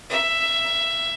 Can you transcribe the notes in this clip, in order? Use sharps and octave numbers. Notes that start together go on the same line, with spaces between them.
E5